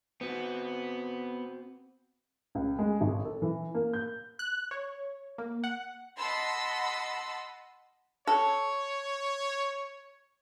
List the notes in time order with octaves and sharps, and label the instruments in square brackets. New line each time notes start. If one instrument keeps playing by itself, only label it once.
[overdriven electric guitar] B3 [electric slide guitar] C4 F#4
[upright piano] C#2
G#3
G#1
A4
E3
A#3
G6
[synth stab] F#6
C#5
A#3
F#5
[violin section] D#5 F#5 A5 B5 C6 E6
[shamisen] A4 [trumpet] C#5